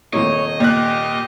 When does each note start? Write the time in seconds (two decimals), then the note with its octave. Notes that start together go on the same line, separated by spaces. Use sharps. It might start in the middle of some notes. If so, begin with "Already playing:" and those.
0.13 D#1 C3 A#3 C#5 D#5
0.60 A#2 G4 F#6